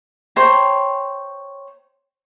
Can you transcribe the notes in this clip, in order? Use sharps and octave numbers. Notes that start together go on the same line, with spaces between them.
C5 C#5 G5 A#5